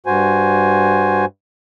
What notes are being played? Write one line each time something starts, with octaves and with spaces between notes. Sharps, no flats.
G2 F#4 C5 G#5